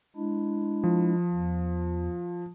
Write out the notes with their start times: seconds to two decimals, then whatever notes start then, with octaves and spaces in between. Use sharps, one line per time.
0.16 G#3 D4 E4
0.84 F3
1.32 E2